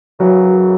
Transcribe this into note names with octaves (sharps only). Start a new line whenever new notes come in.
F#2 C#3 E3 F#3